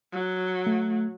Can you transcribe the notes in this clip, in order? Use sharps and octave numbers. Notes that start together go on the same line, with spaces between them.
F#3
A3